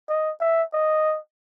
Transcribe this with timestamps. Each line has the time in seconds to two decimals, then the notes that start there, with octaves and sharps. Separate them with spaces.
0.09 D#5
0.41 E5
0.73 D#5